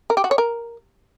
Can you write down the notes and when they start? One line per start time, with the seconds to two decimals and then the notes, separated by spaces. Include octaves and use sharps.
0.10 A#4
0.17 G4
0.24 F#4
0.31 C#5
0.38 A#4